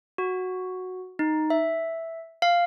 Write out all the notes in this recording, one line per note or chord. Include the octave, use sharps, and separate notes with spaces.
F#4
D#4
E5
F5